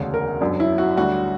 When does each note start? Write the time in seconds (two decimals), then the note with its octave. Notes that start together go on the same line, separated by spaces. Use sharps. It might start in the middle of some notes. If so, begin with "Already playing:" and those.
Already playing: E1 D2 C#3
0.14 A#4
0.41 G1 F#2 D3 F#3
0.60 E4
0.78 F#4
0.97 D2 D3 G3 F#4